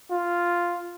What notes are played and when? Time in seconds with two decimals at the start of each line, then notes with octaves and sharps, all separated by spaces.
0.11 F4